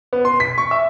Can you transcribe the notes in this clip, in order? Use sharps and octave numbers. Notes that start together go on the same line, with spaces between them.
B3
C6
B6
C#6
E5